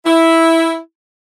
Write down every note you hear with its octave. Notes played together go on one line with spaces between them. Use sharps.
E4